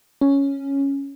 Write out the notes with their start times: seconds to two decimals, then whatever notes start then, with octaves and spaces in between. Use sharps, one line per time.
0.21 C#4